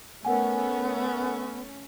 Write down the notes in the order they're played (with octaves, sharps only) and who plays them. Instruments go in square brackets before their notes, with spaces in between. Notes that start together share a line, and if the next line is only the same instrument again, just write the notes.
[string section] A3 C#4 [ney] B3 [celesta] A#4 F#5 G#5